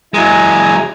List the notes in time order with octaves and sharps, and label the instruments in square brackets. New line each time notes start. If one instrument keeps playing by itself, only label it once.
[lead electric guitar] F#3 G#3 [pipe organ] E4 G#5 A#5